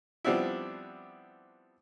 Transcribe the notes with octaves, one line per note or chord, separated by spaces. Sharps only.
F3 G3 B3 C4 D4 E4